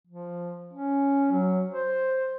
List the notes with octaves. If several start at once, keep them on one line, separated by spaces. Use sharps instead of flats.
F3
C#4
F#3
C5